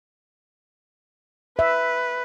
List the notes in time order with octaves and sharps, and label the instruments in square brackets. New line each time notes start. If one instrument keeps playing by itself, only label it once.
[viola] B4 [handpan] E5